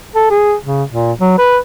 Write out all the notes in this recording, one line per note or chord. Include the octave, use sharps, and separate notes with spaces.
A4
G#4
C#3
A#2
F#3
B4